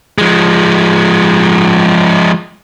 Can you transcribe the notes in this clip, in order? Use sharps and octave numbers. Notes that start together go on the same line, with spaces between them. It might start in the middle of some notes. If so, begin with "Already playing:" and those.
F3 G#3